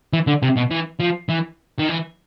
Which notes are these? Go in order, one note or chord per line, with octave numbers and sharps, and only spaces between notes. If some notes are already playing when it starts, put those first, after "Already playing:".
E3
D3
C3
B2
E3
F3
E3
D#3
E3